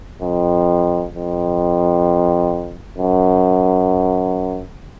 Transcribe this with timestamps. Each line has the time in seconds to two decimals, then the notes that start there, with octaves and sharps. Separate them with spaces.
0.22 F2
1.14 F2
2.98 F#2